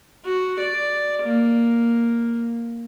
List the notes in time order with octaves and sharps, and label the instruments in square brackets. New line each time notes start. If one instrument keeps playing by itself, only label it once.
[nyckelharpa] F#4
D5
A#3